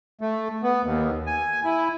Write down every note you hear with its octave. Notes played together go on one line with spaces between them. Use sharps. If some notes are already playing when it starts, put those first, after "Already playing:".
A3
B3
D#2
G#5
E4